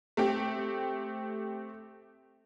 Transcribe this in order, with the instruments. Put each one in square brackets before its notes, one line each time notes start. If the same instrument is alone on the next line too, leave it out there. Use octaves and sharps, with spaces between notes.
[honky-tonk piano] A3 C4 G4